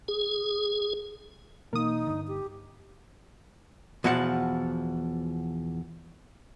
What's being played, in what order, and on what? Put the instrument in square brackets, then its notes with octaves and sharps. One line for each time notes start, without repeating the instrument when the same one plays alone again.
[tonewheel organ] G#4
[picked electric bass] B2 E3 [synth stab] A#3 D#6 [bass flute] D#4
[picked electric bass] G2 D3
[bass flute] G4
[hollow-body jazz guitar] E2 B2 F3 F#5